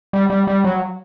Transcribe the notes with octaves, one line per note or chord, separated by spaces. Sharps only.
G3
G3
G3
F#3